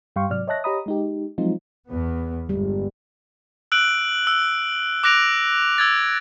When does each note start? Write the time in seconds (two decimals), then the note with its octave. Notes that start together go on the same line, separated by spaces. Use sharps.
0.16 G2 G3 F5 G5 C6 C#6
0.30 G#2 C3 F#3 D5 F6
0.48 C#5 D#5 E5 A5 F#6 A#6
0.64 G4 C#5 D#5 A#5 B5 D#6
0.86 G#3 D#4 G4
1.38 F3 F#3 G#3 C4 D#4 F4
1.89 E2 B3
2.49 G1 G3 G#3
3.72 E6 F#6 D7 F#7
4.27 E6
5.03 D6 F#6 A#6 D7 F7
5.78 E6 G#6 A6